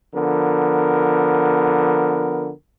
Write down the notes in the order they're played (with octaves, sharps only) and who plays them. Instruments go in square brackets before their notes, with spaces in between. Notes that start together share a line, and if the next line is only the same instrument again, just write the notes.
[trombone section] D3 F3 B3 A#4